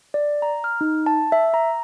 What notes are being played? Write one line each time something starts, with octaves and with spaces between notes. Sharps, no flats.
D5
A#5
F6
D#4
A5
E5
A#5